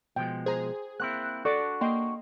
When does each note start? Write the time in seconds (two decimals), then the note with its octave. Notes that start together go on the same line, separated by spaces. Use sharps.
0.16 B2 F3 G#3 G5
0.46 G#4 C5 A#5
1.00 A#3 C4 E4 F#6
1.45 D4 F#4 A4 D5 D6
1.81 A#3 D#5 G5 C6